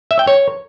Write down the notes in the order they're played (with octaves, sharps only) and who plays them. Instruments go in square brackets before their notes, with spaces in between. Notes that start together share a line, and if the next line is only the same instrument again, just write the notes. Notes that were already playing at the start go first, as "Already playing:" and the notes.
[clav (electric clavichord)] E5
G5
C#5